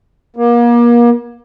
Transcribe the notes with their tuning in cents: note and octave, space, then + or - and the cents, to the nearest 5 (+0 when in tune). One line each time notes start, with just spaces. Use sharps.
A#3 +35